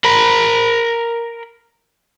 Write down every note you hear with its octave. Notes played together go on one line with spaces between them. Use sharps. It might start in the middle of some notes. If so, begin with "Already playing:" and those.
A#4 B5